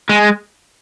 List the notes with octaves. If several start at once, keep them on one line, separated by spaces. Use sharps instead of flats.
G#3